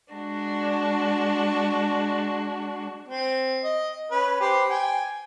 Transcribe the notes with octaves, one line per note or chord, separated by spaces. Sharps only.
G#3 D4 F#4
C4
D#5
C#4 B4
G4 B4 C5
G5 G#5